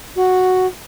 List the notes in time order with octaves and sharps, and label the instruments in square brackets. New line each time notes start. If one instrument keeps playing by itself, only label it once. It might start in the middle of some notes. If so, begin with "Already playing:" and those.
[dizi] F#4